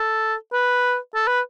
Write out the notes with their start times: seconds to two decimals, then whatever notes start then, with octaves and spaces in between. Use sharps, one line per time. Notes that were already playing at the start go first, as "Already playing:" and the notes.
Already playing: A4
0.53 B4
1.15 A4
1.28 B4